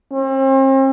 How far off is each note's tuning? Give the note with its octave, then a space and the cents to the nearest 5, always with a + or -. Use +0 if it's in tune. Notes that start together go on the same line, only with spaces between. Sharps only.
C4 +40